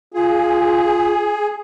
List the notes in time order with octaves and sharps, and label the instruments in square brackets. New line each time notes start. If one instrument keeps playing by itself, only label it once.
[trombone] F4 [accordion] G#4